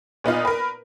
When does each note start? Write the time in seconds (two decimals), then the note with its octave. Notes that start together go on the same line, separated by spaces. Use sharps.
0.24 A#2 B3 D#4 F4
0.45 A#4 B4